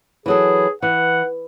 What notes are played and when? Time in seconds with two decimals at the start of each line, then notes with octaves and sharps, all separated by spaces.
0.26 E3 F#3 G#4 A4
0.82 E3 F#5